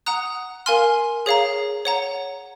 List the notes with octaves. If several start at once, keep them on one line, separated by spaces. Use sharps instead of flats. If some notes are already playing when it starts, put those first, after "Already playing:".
F#5 A#5 D#6 F#6
A#4 F5 G#5 C6 F6
G#4 C#5 F5 A#5
C#5 F#5 A#5